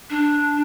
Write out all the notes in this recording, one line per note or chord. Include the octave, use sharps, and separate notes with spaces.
D4